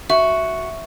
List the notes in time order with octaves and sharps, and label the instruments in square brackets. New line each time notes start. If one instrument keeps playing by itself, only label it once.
[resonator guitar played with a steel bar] F#4 [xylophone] E5